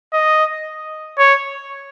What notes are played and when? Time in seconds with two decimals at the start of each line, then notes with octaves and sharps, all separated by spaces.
0.13 D#5
1.18 C#5